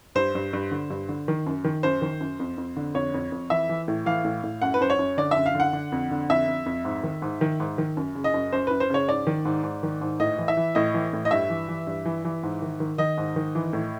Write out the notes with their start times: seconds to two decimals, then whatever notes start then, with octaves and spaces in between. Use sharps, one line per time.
0.15 G2 C5
0.35 G2
0.53 G2
0.71 D3
0.90 G2
1.09 D3
1.28 D#3
1.46 F#2
1.64 D#3
1.83 F#2 C5
2.02 D#3
2.20 F#2
2.39 F2
2.58 F2
2.76 D3
2.94 F2 C#5
3.14 F2
3.32 F2
3.50 E3 E5
3.69 E3
3.88 A2
4.06 E3 F5
4.25 A2
4.43 A2
4.62 F#2 F#5
4.74 B4
4.81 F#2 C5
4.90 C#5
4.99 F#2
5.17 D3 D5
5.31 F#2 E5
5.46 F5
5.55 D3 F#5
5.73 D3
5.92 F2
6.11 D3
6.30 F2 E5
6.47 F2
6.66 F2
6.85 G#2
7.03 D#3
7.22 G#2
7.41 D#3
7.60 G#2
7.78 D#3
7.97 F#2
8.15 C#3
8.24 D#5
8.34 F#2
8.53 F#2 C5
8.67 F#2 B4
8.80 C5
8.90 C#3 C#5
9.08 G#2 D5
9.27 D#3
9.45 G#2
9.63 G#2
9.83 D#3
10.01 G#2
10.20 A2 D#5
10.38 E3
10.48 E5
10.57 E3
10.75 A2 D#5
10.94 E3
11.13 A2
11.25 D#5
11.31 G2 E5
11.50 E3
11.69 E3
11.87 G2
12.05 E3
12.25 E3
12.43 G#2
12.62 D#3
12.80 D#3
12.98 D#3 D#5
13.18 G#2
13.36 D#3
13.55 E3
13.73 A2